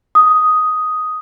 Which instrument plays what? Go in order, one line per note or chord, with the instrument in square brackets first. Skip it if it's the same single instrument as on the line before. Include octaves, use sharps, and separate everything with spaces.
[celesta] D#6